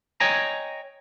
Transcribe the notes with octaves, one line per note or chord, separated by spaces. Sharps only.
C#5 D#5 G5 G#5 A#5